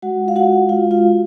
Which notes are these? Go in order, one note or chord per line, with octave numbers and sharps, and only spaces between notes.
G#3 F#4 F#5
F4 F5
F#4 F#5
G#3
G#3 F4 F5
F4 F#4 F5